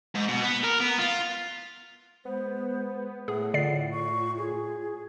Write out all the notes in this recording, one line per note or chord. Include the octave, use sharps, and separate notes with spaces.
G#2
B2
B3
A#4
B3
F4
G#3 B3 C5
A2 G#4 F#5
D3 F4 D5 C7
C#6
G#4